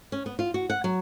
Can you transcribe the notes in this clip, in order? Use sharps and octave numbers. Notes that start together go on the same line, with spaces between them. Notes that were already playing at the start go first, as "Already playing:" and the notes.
C#4
B3
F4
F#4
F#5
F#3